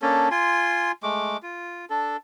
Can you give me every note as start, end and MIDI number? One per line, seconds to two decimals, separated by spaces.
0.02 0.29 58
0.02 0.29 61
0.02 0.29 62
0.02 0.29 69
0.31 0.92 65
0.31 0.92 80
0.31 0.92 84
1.03 1.37 56
1.03 1.37 57
1.03 1.37 86
1.43 1.85 65
1.90 2.17 62
1.90 2.17 69